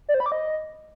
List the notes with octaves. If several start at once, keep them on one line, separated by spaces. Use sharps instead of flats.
D5
C5
B5
D6
D#5